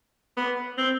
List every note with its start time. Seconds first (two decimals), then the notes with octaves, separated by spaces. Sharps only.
0.37 B3
0.78 C4